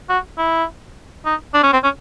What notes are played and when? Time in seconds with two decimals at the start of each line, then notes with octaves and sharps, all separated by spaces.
0.09 F#4
0.38 E4
1.26 D#4
1.54 D4
1.63 C#4
1.73 C4
1.84 C#4